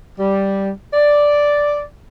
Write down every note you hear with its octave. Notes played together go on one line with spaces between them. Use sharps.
G3
D5